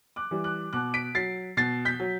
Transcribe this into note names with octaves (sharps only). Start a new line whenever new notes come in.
D6 F#6
E3 G3
D6 F#6
B2 D6 F#6
B6 D7
F#3 A6 C7
B2 A6 C7
G6 B6
F#3